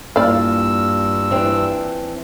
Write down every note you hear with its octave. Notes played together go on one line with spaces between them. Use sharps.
G2 A#2 E4 D5 F5 E6 F6
E3 C4 D4